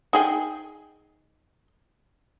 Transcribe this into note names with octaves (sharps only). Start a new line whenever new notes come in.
D#4 G#4 G5